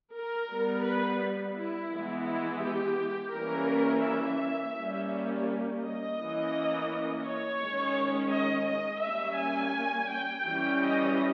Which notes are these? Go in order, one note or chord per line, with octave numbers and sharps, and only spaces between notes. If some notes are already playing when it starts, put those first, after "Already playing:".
A#4
G3 B3
B4
E4
E3 G#3 B3
E4
G4
E3 G3 A#3 C#4 A#4
E5
G3 A#3 C#4
D#5
E3 A#3 C#4
C#5
D#3 G#3 C#4
D#5
D#5
G3 A#3 C#4 E5
G#5
G5
E3 G3 C#4
D#5